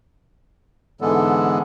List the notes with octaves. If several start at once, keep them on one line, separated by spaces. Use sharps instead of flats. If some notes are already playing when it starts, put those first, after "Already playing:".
G#2 D3 E3 G#3 B3 A4